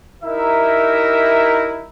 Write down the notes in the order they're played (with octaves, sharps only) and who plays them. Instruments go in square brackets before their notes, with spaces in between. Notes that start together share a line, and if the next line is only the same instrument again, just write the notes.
[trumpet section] D#4 E4 G4 A#4 E5